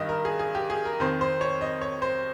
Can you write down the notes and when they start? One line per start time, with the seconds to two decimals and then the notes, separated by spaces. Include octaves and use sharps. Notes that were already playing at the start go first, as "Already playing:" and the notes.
Already playing: G2 D#3 D#5
0.09 A#4
0.25 G#4
0.39 G#4
0.55 G4
0.70 G#4
0.85 A#4
1.00 F2 D#3 C5
1.21 C5
1.41 C#5
1.61 D#5
1.81 C#5
2.02 C5